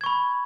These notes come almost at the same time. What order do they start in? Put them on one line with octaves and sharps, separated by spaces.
G#6 C#6 B5